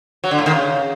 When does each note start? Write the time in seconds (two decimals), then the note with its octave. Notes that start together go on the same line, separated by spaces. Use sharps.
0.24 F#3
0.31 D3
0.39 A2
0.46 D#3
0.54 C#3